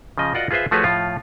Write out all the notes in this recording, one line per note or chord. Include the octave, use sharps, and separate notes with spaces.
C#3 F3 D#5
F4 F#4 A#4 D5 D#5 F#5
F4 G#4 B4 C5 E5
F3 A3 F#4 G#4 B4 C#5
A2 F3 F4